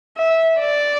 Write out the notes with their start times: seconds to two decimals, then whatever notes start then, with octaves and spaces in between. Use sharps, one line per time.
0.17 E5
0.59 D5